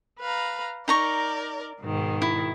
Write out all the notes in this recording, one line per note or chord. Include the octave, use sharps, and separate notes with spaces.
B4 F5 A#5
D#4 A#4 D5 A#5 C#6
G#2 B2 D#3
E4